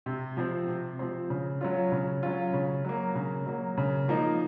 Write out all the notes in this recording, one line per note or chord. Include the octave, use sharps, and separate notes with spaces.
C3
F3 C4
C3
F3 C4
C#3
F#3 C#4 F4
C#3
F#3 C#4 F4
C#3
F#3 A#3
C#3
F#3 A#3
C#3
F3 A#3 D#4